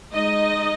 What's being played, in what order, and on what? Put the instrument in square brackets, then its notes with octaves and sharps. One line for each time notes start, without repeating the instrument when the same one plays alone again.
[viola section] G#3 D#4 D#5